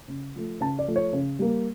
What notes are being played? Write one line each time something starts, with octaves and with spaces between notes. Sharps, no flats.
C#3
F3 A3
C#3 A5
D5
F3 A3
C#5
C#3
G3 A#3